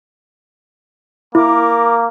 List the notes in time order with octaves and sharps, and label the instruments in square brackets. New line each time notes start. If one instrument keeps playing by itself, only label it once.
[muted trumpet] A#3 [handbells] E4 [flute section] A#4 D6